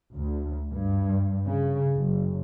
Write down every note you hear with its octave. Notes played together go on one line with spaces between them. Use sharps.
D2
G2
C#3
F#1